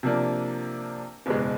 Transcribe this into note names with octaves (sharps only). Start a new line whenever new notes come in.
C3 F3 A#3 D4
F#1 E2 B2 G#3